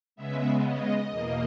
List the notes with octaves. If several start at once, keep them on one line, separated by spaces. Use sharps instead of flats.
C#3 G#3 B3 E5
D#5
E2 B2 A#3